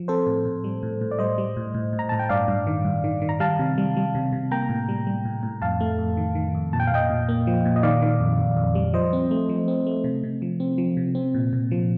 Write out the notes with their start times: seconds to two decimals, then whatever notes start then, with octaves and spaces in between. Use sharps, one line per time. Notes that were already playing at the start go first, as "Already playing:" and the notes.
Already playing: F3
0.08 C4 A4 C5
0.26 A2
0.45 A2
0.64 G3
0.83 A2
1.01 A2
1.11 D5
1.19 G3 C5 D#5
1.38 G3
1.57 A2
1.74 A2
1.93 A2
1.99 A#5
2.09 A2 A5
2.19 G5
2.29 G2 D5 F5
2.48 G2
2.67 D#3
2.85 G2
3.04 D#3
3.22 D#3
3.29 A#5
3.40 G3 F5 A5
3.59 C3
3.78 G3
3.97 G3
4.15 C3
4.32 C3
4.51 A#3 G5 A#5
4.69 A2
4.89 G3
5.07 G3
5.25 A2
5.43 A2
5.62 F2 F5 A5
5.81 A3
5.98 F2
6.17 D#3
6.35 D#3
6.55 F2
6.73 A#2 A5
6.80 G5
6.87 F5
6.92 A#2 D#5 G5
7.10 A#2
7.29 A#3
7.47 F3
7.65 A#2
7.76 D#5
7.83 D#3 D5 F5
8.02 D#3
8.20 F2
8.39 F2
8.57 F2
8.75 G3
8.93 F3 C5 D#5
9.13 C4
9.31 A3
9.49 F3
9.68 C4
9.87 A3
10.04 C3
10.23 C3
10.42 F3
10.60 C4
10.78 F3
10.97 C3
11.15 C4
11.35 A#2
11.53 A#2
11.71 F3